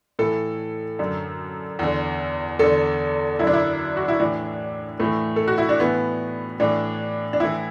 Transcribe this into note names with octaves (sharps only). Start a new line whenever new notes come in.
A2 E3 A4
F#2 D3
E2 D3
E2 D3 A4
F#2 D3 E4
D4
E4
F#4
E4
A2 E3 D4
A2 E3 A3
A4
F#4
E4
D4
A2 E3 B3
A2 E3 D4
D4
A2 E3 E4